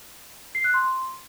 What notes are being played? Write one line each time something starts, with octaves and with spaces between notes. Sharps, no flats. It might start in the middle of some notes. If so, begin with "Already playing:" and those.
C7
F#6
C6